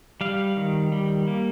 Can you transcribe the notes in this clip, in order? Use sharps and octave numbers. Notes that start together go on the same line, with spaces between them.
G3 F5
D#3
G3
A#3